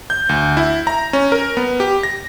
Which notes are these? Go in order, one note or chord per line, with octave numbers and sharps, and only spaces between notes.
G6
D2
E4
A#5
C#4
A#4
B3
G4
A#6